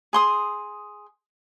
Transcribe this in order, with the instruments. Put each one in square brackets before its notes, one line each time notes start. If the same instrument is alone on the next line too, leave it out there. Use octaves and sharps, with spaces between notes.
[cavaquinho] G#4 C6 D#6